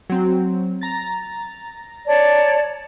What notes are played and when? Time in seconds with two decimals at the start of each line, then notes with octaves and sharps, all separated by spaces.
0.10 F#3 C4
0.81 A#5 A6
2.06 C#5 D5 A5